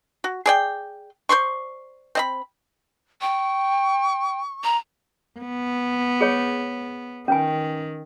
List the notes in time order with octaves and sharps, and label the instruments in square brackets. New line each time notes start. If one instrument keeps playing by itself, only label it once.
[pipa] F#4
G#4 D5 G5
C5 D5 C6 C#6
C4 D#5 B5
[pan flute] G5 [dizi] C#6
[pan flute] A#5
[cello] B3
[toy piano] G#4 C#5
[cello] D#3 [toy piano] C#4 B4 G#5